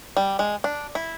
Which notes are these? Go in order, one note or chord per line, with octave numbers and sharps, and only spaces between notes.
G3
G#3
D4
E4